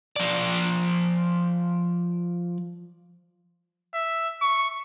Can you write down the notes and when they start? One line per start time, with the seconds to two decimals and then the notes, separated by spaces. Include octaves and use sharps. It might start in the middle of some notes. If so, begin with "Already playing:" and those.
0.16 F3 D5
3.94 E5
4.42 C#6